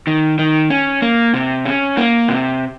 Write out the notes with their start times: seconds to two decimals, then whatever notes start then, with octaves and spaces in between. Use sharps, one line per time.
0.07 D#3
0.39 D#3
0.70 C#4
1.02 A#3
1.34 C3
1.66 C#4
1.97 A#3
2.29 C3